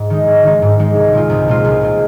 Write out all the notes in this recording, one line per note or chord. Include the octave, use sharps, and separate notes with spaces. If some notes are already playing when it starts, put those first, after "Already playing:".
Already playing: G#2
D#3 G#3 D#4
G#2
D#3 G#3 D#4
G#2
D#3 G#3 D#4
C2
A#2 G#3 F4
C2
A#2 G#3 F4
C2
A#2 G#3 F4